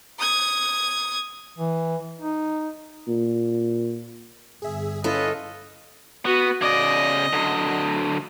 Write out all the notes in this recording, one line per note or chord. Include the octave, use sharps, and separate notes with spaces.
D#6 G#6
E3
D#4
A#2
G1 G#4 E5
C#4 E4 F4 A4 B4 C#5 D#5
B3 F#4
C#3 D5 D#5
D3 F#3